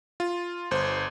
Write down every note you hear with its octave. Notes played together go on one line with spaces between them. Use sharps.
F4
G1 C5